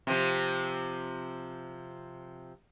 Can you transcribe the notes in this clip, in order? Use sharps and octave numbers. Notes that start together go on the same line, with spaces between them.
C3 F3